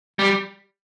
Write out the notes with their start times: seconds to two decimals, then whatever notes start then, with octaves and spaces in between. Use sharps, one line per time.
0.19 G3